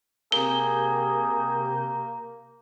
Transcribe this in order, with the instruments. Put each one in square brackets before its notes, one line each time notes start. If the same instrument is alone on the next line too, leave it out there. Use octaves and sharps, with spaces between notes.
[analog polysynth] C3 G4 G6 [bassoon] A#3 [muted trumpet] G#4 [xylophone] G7